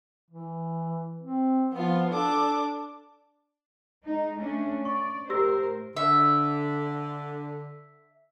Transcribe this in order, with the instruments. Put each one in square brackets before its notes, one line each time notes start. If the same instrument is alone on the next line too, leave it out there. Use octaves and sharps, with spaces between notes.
[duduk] E3
C4
[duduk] F3 [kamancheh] B3 F4
[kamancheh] D4 D6 [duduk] A4
[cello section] G#3 D#4
A3 C#4 D4
[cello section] D5 [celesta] C#6
[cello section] A2 A#4 C5 [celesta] G4 E6 A#6
[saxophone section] D3 [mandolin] E5